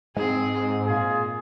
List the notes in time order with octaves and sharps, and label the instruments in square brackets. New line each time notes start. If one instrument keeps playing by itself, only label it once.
[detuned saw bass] G#2 [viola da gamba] C4 G#4
[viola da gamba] A#2 [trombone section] F4 G#4